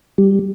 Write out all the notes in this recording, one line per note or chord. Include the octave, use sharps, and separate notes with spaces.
G3